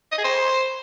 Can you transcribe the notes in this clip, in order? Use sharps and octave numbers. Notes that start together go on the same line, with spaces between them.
D#5
G#4
C5